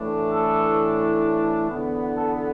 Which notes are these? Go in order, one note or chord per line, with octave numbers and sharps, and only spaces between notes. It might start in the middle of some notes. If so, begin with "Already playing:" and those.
Already playing: A2 E3 A3 D4
A4
E2 D3 B3
A4